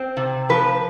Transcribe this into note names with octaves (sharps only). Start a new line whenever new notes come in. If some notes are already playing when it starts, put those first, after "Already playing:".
Already playing: C4
C3
F3 B4